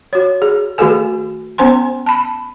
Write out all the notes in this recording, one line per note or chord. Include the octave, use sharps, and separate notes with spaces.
F#4 C#5
G#4
D#3 A3 F#4 G#4 A4 G#5
B3 C#4 C5 G#5 C6
A5 B5